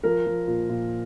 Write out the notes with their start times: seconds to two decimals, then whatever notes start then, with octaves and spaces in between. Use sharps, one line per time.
0.03 F3 A#4
0.26 F3
0.47 A#2
0.69 A#2